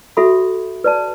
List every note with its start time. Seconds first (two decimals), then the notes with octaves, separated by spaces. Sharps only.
0.17 F#4 A4 E5 B5
0.84 B4 D5 A5